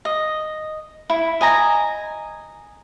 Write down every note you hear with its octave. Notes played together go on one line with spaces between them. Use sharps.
D#5
E4
D#5 G#5 A#5